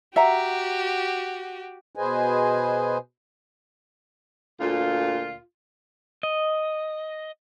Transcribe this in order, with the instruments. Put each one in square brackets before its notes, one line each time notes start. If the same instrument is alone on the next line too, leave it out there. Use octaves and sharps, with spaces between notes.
[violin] F#4 G4 [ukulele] E5 F#5 A#5
[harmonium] B2 G#4 B4 C5 D#5 G#5
[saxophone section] D2 A#2 F4
[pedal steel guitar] D#5